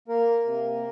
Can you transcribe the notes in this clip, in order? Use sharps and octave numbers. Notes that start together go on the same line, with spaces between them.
A#3 A#4
C3